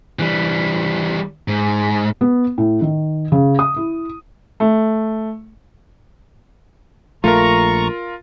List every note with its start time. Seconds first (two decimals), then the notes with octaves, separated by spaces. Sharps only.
0.19 E3 G3
1.48 G#2
2.21 B3
2.58 A2
2.81 D#3
3.32 C#3
3.59 D#6
3.76 E4
4.60 A3
7.24 A#1 A3 F4 A#4 A#5 C#6